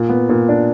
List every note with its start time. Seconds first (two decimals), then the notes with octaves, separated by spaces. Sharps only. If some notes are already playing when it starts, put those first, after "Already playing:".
Already playing: A#2
0.09 B3
0.29 A#2
0.49 D4